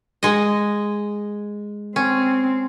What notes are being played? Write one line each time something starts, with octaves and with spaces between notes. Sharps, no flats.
G#3 D#5
C4 C#4